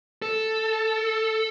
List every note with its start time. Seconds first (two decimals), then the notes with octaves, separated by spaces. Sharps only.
0.22 A4